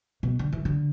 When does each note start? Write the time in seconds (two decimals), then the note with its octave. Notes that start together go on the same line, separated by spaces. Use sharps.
0.23 B2
0.39 D3
0.53 E3
0.65 D3